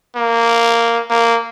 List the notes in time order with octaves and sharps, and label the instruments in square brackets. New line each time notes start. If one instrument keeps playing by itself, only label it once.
[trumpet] A#3
A#3